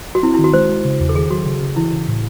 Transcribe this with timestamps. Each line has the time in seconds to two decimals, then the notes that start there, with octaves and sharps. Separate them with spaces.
0.15 F#4
0.23 C4 E4
0.34 E4
0.39 D#3
0.44 F#4
0.53 G#3 C5
0.69 G#3
0.85 C#3
1.00 E2
1.09 A4
1.15 D#3 G#4
1.30 F#3 F#4
1.46 C#3
1.62 C#3
1.76 E3 E4
1.92 C#3
2.08 A2